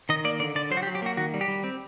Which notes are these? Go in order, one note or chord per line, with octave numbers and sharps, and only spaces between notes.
D#3 D#5
A#3 D5
D3 D5
D3 D5
F#3 C5
F#4
G4
F#3
G4
A#3 F#4
D#3 F#4
G3
G4
G3
C4